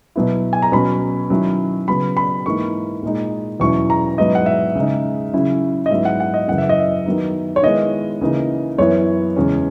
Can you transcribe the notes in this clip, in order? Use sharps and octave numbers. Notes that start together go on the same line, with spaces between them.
B2 F#3 B3 E4
G#5
A#5
B2 F#3 C#4 B5
D#3 F#3 C#4 E4
C#3 F#3 B3 B5
B5
G#2 E3 A#3 D#4 C#6
A#2 G#3 D#4
E2 B2 F#3 C#4 E4 C#6
A#5
G#2 F#3 B3 E4 D#5
F#5
E5
C#3 G#3 D#4
C#3 F#3 C#4 E4
D#5
G#2 F#3 B3 E4 E5
F#5
F#5
D#5
F#2 C#3 E3 F#5
E5
D#5
E5
D#3 F#3 B3 D#4
C#5
D#3 G#3 B3 E4 D#5
C#3 E3 A#3 D#4
F#2 E3 B3 E4 C#5
E2 C#3 E3 G#3 C#4